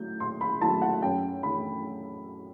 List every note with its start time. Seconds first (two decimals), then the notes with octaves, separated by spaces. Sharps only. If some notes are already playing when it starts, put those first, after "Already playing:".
Already playing: A2 F#3 A3 E4 G6
0.20 A2 C6
0.41 B5
0.61 F#3 A3 E4 A5
0.82 F#5
1.02 F#2 G5
1.43 E3 A3 D4 B5